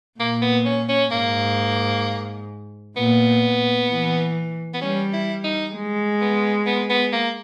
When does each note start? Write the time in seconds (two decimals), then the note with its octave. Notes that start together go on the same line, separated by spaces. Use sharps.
0.19 A#2 A#3
0.42 B3
0.65 C#4
0.89 C#4
1.12 G#2 A#3
2.96 A#2 B3
3.89 E3
4.74 B3
4.81 G3 C#4
5.13 E4
5.44 D#4
5.74 G#3
6.21 B3
6.67 B3
6.90 B3
7.13 A#3